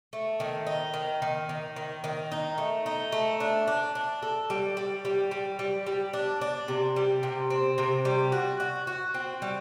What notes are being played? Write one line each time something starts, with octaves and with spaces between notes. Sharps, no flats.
A3
D#3
D#4
D#3
D#3
D#3
D#3
D#3
D#4
A3
D#4
A3
D4
D4
D4
A4
G3
G3
G3
G3
G3
G3
D4
D4
C3
G3
C3
C4
C3
G3
F#4
F#4
F#4
C4
G3